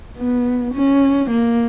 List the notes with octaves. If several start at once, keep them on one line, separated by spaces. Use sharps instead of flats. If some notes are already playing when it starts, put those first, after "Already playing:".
B3
C#4
A#3